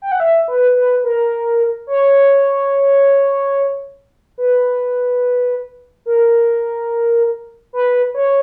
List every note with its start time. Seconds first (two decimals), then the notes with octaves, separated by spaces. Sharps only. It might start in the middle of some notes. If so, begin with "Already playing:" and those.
0.02 G5
0.12 F#5
0.20 E5
0.48 B4
0.76 B4
1.04 A#4
1.87 C#5
4.38 B4
6.06 A#4
7.73 B4
8.14 C#5